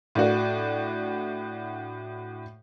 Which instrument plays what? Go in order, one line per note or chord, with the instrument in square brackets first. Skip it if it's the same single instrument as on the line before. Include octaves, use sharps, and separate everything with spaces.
[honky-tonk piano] A2 D4 F#4